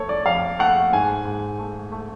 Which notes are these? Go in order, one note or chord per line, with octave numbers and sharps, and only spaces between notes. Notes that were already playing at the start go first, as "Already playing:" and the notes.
Already playing: F3 A3 A4 C#5
D5
F2 F5
A3 F#5
G#2 G#5
G#2
A3
A3